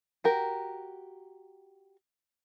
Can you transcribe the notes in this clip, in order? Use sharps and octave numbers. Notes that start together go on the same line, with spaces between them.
F#4 G4 A#4